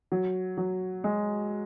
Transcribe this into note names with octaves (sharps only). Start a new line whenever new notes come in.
F#3
F#3
G#3